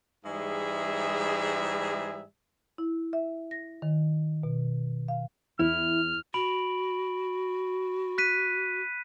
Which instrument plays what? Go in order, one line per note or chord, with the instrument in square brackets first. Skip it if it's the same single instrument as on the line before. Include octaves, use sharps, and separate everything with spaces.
[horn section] G#2 E3 G3 G#3 G#4 E5
[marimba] E4
E5
A#6
D#3
B2
F5
[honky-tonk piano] E2 [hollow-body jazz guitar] E4 [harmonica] F6
[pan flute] F#4 [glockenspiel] B5 D7 F#7
[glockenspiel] F#6 B6 D#7